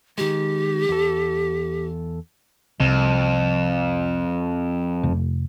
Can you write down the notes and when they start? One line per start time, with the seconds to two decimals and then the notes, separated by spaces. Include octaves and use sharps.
0.18 D#3 G#3 G4
0.89 E2 A4
2.80 C2 F2
5.03 F1